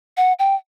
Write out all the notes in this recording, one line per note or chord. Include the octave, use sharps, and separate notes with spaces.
F#5
G5